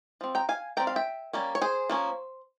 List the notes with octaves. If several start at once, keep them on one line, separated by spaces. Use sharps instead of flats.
F3 C4
G5 A#5
F5 G#5
G3 C4 G5 A#5
F5
E5 G5
G3 A#3 C#4
C#5
G#4 C5
F3 A#3 C#4